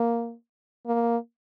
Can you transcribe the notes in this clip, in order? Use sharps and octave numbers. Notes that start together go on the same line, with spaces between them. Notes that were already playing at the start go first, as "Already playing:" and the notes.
Already playing: A#3
A#3